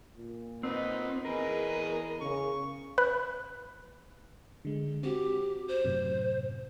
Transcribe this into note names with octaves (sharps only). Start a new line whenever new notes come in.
A#2
B3 C4 D#4
E2 G#4 A#4 B4 D#5
C#3 C#6
B4 F#6
D3 G#3
C4 F#4 G4
C5
F#2 A2 C3